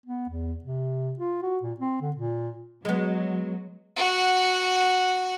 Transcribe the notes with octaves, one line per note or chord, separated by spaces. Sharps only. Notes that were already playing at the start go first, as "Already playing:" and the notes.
B3
E2
C3
F4
F#4
A#2
C4
D3
A#2
F#3 G#3 B3
F#4 F#5